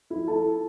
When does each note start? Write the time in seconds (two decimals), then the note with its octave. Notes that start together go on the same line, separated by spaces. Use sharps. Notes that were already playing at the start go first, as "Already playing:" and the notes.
0.10 F3 E4 E5
0.27 F3 A4 A5